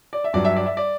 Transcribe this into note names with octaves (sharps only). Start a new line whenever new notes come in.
D5
E5
G2 F#3 D5
E5
D5
E5
D5